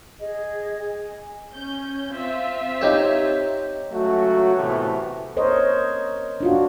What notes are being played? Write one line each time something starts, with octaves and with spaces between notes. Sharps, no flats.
G#4 D#5
G#5
C#4 G6
C4 F4 E5
D#4 G4 C#5
C#2 F#3 A3 F#4
F2 A2 C3 E3 A3 B3
A#4 C5 C#5 D#5
D4 F4 F#4